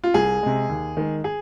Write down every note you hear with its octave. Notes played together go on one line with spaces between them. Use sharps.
F4
C2 G#4
C3 G#3
D#2
D#3 G#3
G#4